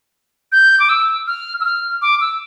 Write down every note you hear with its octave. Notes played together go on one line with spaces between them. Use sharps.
G6
D6
E6
F6
E6
F6
D6
E6